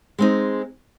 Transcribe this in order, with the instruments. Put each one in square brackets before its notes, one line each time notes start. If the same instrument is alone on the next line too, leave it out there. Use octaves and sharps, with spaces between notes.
[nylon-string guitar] G#3 C4 D#4